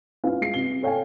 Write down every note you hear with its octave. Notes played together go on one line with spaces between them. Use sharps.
C#4 E4 F4 B4 F5
G#3 C7
C3 G7
A4 C#5 F5 G5 G#5